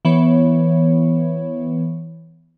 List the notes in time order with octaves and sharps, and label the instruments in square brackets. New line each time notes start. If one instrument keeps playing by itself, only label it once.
[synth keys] E3 B3 C#5